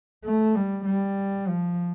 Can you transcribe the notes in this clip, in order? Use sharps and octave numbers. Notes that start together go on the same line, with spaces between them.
A3
G3
G3
F3